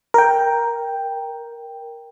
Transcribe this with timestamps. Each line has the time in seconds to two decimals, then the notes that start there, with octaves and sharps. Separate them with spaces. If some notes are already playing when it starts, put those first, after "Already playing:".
0.14 A#4 G5